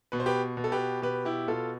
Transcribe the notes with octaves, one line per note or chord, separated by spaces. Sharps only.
B2 B4
C5
G4 B4
B2
A4
G4 B4
B2 G4 B4
E4 G4
B2 F4 A4